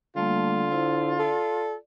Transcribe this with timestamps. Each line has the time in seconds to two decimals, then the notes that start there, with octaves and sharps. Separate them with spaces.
0.16 D3 G3 A3 A#3 F4
0.72 E4 C5
1.19 A4 D5